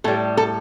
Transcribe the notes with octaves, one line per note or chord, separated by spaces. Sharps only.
A2 G3 A4
A4